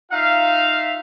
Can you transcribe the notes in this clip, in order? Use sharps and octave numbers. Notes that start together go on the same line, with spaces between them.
D#4 F4 E5 F5